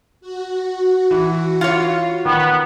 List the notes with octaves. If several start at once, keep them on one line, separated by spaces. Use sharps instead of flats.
F#4
E3
F4 C#5
D#3 B3